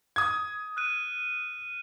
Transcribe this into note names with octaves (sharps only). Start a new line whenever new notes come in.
D#6 G#6
F6 F#6 D#7